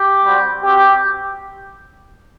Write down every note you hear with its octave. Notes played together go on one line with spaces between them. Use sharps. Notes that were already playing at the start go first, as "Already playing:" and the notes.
Already playing: G4
G3 C4 F#4
C4 F#4 G4